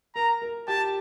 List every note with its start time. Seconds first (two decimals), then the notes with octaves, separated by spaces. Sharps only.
0.15 A#4 A#5
0.42 A#4
0.67 G4 A5